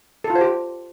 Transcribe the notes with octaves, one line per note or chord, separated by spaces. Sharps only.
A4
F4
C5
G4